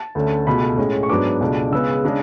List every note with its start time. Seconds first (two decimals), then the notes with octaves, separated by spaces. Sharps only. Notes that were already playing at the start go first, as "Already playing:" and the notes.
Already playing: A5
0.15 D2 D3 A3 C#4
0.46 C#2 B2 A3 B5
0.77 A2 G#3 C#4
1.03 C#6
1.09 G#2 F#3 B3 D4 D6
1.40 C#2 B2 A3 D4
1.72 C#3 G#3 B3 E6
2.05 C#3 G#3 D4